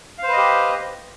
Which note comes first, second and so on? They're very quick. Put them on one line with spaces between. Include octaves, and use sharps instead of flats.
F5 C5 B4 D#5 G4